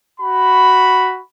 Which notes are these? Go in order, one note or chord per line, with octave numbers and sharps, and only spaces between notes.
F#4 B5